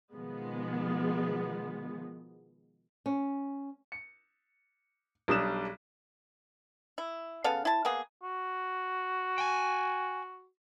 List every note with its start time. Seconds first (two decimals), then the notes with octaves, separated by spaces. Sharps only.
0.13 B2 D#3 F3 G#3 B3
3.06 C#4
3.92 C#7
5.28 B1 G3 D4 D#6 F#6 E7
6.98 E4
7.44 C#3 B3 A4 F5
7.65 E4 A5
7.85 A#3 B3 G#4
8.23 F#4
9.38 G5 G#5